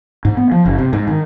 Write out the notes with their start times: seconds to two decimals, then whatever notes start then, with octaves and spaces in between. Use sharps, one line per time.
0.25 G#2
0.37 B3
0.52 F3
0.66 F#1
0.79 C3
0.93 G#2
1.08 D#3